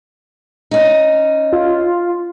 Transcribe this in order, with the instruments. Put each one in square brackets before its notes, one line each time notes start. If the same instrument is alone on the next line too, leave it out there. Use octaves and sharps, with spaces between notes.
[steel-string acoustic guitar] C#4 D#4
[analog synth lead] F4